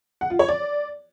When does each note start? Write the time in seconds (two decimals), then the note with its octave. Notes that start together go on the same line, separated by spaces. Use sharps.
0.21 F#5
0.30 F4
0.39 C#5
0.48 D5